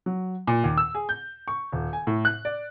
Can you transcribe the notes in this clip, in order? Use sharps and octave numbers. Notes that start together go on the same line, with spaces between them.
F#3
A#2
D#2
E6
G#4
G6
C#6
D#1
G#5
A2
F#6
D5